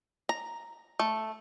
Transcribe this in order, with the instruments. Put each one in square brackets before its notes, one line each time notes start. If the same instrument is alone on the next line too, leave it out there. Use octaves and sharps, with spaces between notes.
[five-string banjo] A#5
A3